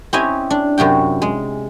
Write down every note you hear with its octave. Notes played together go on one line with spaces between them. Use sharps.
C4 C#4 E4 G4 D#5 G#5
D4
F#2 C3 F#4 G5
G#3